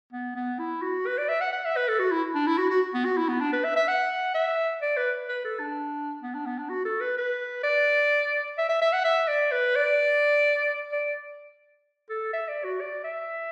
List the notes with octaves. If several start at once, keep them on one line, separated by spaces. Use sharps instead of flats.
B3
B3
E4
F#4
B4
D5
E5
F#5
F#5
E5
B4
A4
F#4
E4
D4
E4
F#4
F#4
B3
F#4
E4
B3
D4
B4
E5
E5
F#5
E5
D5
B4
B4
A4
D4
B3
D4
B3
D4
F#4
A4
B4
B4
D5
E5
E5
E5
F#5
E5
D5
B4
D5
D5
A4
E5
D5
F#4
D5
E5